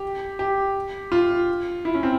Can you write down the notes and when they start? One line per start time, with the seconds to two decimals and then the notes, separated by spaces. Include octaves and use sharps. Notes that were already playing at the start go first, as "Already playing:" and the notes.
Already playing: G4
0.39 G4
1.12 F4
1.85 E4
1.95 C#4
2.03 C4